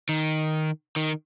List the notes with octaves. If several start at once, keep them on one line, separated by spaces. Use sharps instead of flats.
D#3
D#3